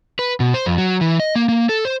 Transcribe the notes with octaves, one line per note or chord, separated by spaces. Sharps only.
B4
B2
C5
F2
F#3
E3
D#5
A#3
A#3
A4
C5